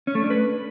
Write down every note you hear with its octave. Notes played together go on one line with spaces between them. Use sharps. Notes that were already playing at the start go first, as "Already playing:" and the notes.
C#4
A3
D4
B4